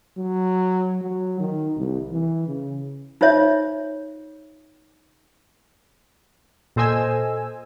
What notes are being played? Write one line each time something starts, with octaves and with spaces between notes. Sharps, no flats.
F#3
F#3
D#3
C2
E3
C#3
D#4 F4 C5 C#5 E5
A#2 A4 C5 D#5 G#5 E6